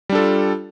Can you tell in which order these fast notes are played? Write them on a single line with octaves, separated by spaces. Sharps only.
G3 D4 A4 F4